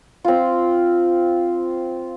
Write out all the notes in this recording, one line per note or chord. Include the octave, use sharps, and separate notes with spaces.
C4 F4